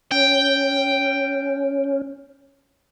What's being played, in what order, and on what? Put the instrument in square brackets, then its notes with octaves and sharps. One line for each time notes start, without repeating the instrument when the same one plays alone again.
[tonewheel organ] C#4 [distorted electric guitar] G5